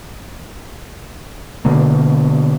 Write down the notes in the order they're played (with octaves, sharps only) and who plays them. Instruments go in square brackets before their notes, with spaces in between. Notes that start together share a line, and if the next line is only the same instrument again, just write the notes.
[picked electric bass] B2 D3 A#3